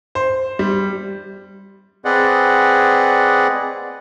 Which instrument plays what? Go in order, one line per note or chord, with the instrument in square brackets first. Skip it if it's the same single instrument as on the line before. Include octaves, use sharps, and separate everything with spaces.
[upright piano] C5
G3
[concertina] C4 G#4 B4 D5 D#5 F#5